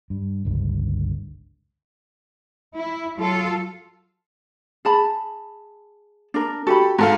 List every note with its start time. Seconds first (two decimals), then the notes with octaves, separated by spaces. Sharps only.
0.10 G2
0.45 G1 C#2 G2
2.75 E4
3.16 F#3 F4 A4
4.85 G#4 A5 B5
6.34 D4 A#4
6.67 F#4 G4 A4 B5
6.98 G#2 A4 F5